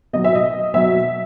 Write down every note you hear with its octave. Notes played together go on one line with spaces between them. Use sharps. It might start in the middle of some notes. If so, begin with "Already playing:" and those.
B2 F#3 D#5
E5
D#5
B2 F#3 E5